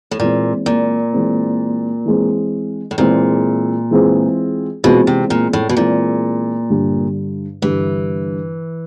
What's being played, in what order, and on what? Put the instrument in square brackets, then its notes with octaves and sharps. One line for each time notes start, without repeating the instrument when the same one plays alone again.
[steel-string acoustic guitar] A2
[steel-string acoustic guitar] A#2 [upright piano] E3 G#3 C4
[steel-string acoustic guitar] A#2
[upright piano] E3 G#3 C4
E3 G#3 C4
[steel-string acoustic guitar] A2
[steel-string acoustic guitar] A#2 [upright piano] E3 G#3 C4 F4 G#4
[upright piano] E3 G#3 C4 F4 G#4
[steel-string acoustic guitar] B2 [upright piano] E3 G#3 C4 F4 G#4
[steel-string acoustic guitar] C3
A#2
A2
B2
[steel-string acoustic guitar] A#2 [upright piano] E3 G#3 C4 F4 G#4
[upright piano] G2 D3 G3
[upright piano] G2 D3 G3 [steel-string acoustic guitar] E3